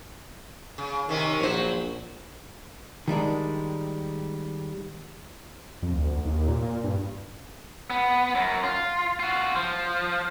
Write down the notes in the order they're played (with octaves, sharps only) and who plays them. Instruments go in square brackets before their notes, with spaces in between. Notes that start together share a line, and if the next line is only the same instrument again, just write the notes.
[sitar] C#3
[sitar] C3 C#4 [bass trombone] D#3
[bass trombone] A#1 [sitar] F#3 C5
[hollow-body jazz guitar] D#3 G3 G#3 D4
[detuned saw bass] F2
D2
D#2
A#2
A#2
G2
[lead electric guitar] B3
F#2
F4
F4 F#4
F3